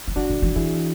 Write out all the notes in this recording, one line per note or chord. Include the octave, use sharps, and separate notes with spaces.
E3
F#3 D4 F#4
D3
E3
E3 E4 G#4